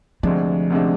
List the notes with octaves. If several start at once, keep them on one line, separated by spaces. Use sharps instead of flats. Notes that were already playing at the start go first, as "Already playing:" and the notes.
D2 C3 F3 G#3 D4
D2 C3 G#3 D4